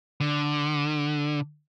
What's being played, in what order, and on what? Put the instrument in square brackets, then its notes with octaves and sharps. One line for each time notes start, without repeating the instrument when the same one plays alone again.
[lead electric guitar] D3